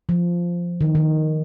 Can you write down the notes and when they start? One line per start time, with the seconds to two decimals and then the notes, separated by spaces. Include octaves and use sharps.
0.09 F3
0.81 D#3
0.95 D#3